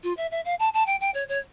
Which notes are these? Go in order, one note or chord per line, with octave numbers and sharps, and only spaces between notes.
F4
E5
E5
F5
A5
A5
G5
G5
C#5
C#5